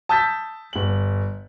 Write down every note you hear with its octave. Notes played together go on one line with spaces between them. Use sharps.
A5 D#6 E6 G6 A6 B6
G1 F#7